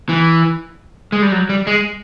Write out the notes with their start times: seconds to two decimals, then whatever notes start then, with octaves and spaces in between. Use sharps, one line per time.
0.09 E3
1.12 G#3
1.22 G3
1.32 F#3
1.49 G3
1.67 G#3